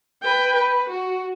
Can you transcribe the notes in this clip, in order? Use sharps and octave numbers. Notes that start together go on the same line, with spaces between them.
B4 G5
B4
F#4